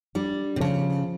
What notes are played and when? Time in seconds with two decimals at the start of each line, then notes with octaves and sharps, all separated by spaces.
0.15 G3 D4
0.56 C3
0.60 C#3 F3